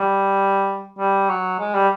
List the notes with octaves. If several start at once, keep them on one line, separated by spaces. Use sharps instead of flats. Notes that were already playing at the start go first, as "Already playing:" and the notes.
Already playing: G3
G3
F#3
G#3
G3